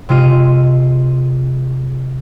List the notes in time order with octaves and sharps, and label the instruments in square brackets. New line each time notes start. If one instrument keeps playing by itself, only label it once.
[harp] C3 G#3 F4 D#7